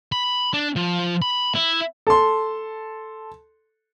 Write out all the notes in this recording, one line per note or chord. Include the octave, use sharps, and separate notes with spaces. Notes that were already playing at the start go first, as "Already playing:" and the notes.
B5
D4
F3
B5
E4
A4 C6